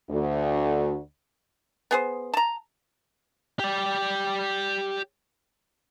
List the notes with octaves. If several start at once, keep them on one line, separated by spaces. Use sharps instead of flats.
D2
B3 G#4 C5
A5 A#5
G4 D5